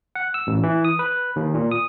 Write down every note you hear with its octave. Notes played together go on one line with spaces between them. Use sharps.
F#5
E6
A1
E3
D#6
B4
D#2
A#2
D#6